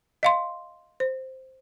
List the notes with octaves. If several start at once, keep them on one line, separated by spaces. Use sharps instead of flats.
D#5 F5 C6
C5